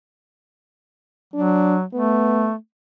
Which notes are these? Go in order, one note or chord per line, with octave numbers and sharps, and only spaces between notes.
F#3 D4
A3 B3